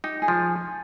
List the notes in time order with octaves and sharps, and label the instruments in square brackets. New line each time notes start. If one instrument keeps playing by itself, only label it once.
[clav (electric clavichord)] D#4 [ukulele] G4
[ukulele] G#4
[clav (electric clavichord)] F3